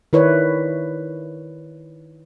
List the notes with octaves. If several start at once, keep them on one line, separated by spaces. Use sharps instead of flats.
D#3 E4 B4 C#5 D5